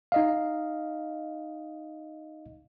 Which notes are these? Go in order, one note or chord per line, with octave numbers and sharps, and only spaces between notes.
D#4 D#5 F5